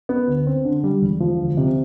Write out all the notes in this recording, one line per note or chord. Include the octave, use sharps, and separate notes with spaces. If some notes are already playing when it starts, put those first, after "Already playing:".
B3
D2
C4
D3
G3
E1
F3
D2
C3